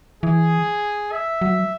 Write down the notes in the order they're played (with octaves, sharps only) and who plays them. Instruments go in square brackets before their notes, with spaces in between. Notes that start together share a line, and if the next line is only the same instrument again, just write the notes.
[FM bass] E3 [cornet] G#4
[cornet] E5
[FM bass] F#3